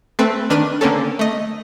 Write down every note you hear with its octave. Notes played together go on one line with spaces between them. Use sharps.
A3 C4 B4
D#3 D4 B4 F6 D#7
D3 A#3 C4 C#4 A4
A3 D#5